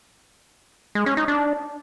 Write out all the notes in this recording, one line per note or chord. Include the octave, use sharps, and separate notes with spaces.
G#3
C#4
D#4
D4